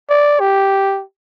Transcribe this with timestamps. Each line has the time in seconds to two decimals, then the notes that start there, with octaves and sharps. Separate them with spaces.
0.09 D5
0.40 G4